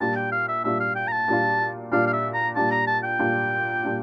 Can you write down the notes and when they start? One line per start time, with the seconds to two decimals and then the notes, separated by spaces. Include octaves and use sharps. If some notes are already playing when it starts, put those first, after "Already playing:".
0.01 A#2 G3 D4 F4 A5
0.16 G5
0.32 F5
0.48 E5
0.64 A#2 G3 D4 F4 E5
0.80 F5
0.96 G5
1.08 A#5
1.12 A5
1.28 A#2 G3 D4 F4
1.92 A#2 G3 D4 F4 F5
2.06 F5
2.13 E5
2.34 A#5
2.55 A#2 G3 D4 F4 A5
2.71 A#5
2.87 A5
3.03 G5
3.19 A#2 G3 D4 F4
3.83 A#2 G3 D4 F4